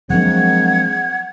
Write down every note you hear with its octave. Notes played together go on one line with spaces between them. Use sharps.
F3 F#3 G#3 A#3 C4 D4 F#5 G#6